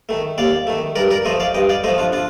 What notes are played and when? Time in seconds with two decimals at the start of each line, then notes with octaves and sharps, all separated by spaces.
0.09 D#3 A3
0.38 D#2 D5 F5
0.67 D#3 A3
0.96 G2 A#4 D5
1.11 A#4 D5
1.25 F3 A3 C5 D#5
1.40 D5 F5
1.54 G2 D#5 G5
1.69 D5 F5
1.84 A3 C5 D#5
1.88 F3
1.98 D4 F4
2.13 D4 F4